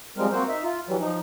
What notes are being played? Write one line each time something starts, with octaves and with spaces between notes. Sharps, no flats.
F3 G3 G#3 C4 A#4
A#3 C4 F#4 C5
D#4 E5
F4
E3 F#3 G3
F3 D#4